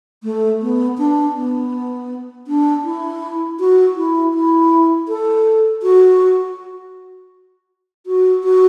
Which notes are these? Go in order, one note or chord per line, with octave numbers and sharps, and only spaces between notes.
A3
B3
D4
B3
D4
E4
F#4
E4
E4
A4
F#4
F#4
F#4